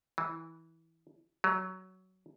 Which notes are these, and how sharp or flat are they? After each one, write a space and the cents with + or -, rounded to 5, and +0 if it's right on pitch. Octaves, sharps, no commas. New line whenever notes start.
E3 -15
F#3 +15